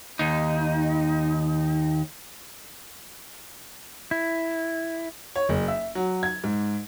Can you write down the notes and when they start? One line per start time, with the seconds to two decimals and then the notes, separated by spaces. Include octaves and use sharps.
0.19 D#2 D#4
4.11 E4
5.36 C#5
5.49 F#1
5.68 E5
5.95 F#3
6.23 G#6
6.44 G#2